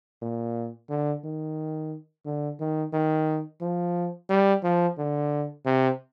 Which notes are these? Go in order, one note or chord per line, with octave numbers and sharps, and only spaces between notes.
A#2
D3
D#3
D3
D#3
D#3
F3
G3
F3
D3
C3